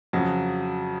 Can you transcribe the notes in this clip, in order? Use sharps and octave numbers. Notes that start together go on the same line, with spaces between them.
F2 C#3 F#3